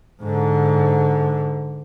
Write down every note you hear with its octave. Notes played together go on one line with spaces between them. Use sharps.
G#2 D3